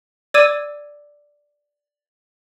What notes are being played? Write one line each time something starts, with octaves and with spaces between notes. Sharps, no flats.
D5 D6 E6 G#6 D#7